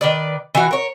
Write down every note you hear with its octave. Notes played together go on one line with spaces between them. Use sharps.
D#3 B4 D5
E3 F#4
A#4 C#5